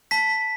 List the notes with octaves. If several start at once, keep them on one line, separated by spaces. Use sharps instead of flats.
A5 B6